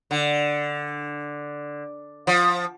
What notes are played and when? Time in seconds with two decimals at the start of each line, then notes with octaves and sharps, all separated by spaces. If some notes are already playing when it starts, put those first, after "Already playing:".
0.11 D3
2.27 F3